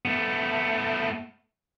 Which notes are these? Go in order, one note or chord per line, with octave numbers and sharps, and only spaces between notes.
A3 B3